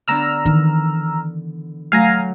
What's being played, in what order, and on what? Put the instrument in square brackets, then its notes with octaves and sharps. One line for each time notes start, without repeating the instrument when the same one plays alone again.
[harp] D3 B3 D4 [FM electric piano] A#5 E6 F6
[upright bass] D#3 E3
[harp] F#3 A3 [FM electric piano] F5 G#5 A#5